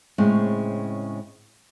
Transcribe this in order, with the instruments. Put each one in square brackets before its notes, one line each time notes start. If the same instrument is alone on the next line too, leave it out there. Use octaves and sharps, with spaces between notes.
[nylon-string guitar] A2 C#3 G#3 C4